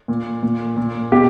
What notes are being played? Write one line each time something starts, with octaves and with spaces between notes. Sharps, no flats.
A#2
A#2
A#2
B2 G4